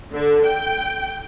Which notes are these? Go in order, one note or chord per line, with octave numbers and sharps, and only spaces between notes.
D3
G5